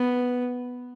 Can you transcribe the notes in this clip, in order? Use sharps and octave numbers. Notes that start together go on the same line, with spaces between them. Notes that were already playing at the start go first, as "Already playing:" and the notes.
Already playing: B3